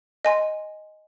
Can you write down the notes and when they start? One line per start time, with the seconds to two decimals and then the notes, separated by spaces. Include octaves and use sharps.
0.25 D#5 G#5 C6